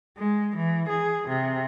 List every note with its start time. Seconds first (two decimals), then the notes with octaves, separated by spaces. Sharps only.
0.18 G#3
0.57 E3
0.89 G#4
1.27 C3